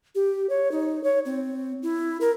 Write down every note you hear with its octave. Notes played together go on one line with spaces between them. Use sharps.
G4
C#5
D#4
C#5
C4
E4
A#4